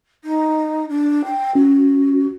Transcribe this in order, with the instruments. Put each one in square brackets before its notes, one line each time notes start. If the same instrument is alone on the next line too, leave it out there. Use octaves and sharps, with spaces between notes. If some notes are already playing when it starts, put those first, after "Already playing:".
[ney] D#4
D4
G5
[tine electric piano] C#4 [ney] F#4